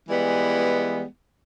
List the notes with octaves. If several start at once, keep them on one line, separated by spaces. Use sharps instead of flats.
E3 G3 G#3 B3